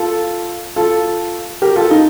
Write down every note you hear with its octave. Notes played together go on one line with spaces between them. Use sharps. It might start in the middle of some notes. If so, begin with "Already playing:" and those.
Already playing: F4 A4
F4 A4
G4 A#4
F4 A4
D#4